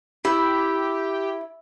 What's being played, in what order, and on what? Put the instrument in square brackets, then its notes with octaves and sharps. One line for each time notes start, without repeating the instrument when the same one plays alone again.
[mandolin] E4 [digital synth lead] G4